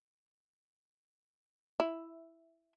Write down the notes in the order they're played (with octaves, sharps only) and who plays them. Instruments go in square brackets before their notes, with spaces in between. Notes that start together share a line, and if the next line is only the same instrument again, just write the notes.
[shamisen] E4